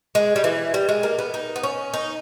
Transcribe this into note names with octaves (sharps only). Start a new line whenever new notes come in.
G#3
G3
E3
G3
G#3
A#3
B3
D#4
B3
C#4
D#4